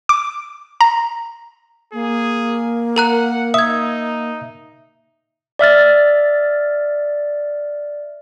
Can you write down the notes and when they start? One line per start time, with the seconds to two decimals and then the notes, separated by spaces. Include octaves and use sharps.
0.09 D6
0.81 A#5
1.93 A#3 G#4
2.96 A#4 F#5 A#5 F#6
3.54 D#4 E5 D#6 G#6
5.59 D5 E5 F6 A6